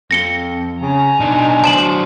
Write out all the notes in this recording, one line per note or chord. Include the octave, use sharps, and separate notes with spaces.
F2 A#6 C#7 G7
C#3 G#5 A#5
B2 D4 D#4
F#3 C5 A5 E7 F#7